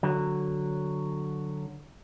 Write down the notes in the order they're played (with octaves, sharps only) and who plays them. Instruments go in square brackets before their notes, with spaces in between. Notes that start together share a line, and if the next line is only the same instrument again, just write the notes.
[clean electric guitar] D3 F#3